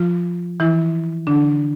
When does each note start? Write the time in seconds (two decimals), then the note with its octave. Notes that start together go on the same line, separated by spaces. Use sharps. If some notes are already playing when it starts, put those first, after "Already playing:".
Already playing: F3 F4
0.60 E3 E4
1.27 D3 D4